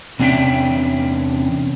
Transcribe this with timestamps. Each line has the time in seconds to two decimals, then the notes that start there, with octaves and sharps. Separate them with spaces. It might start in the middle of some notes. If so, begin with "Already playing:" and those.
0.20 E2 C3 C#4 D4 E5 G5